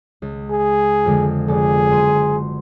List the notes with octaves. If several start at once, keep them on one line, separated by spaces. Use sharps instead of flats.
C#2
G#4
F2 D3 G#3
F1 G#4 D5
F#1 C6 D#7